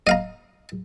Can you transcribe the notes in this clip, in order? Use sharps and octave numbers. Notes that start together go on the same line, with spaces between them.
D#5 F5 A#5